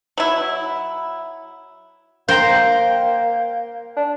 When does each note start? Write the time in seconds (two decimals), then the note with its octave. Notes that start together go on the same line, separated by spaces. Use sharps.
0.18 F#3 E4
2.28 A#3 C5 G5 A#5
3.97 D4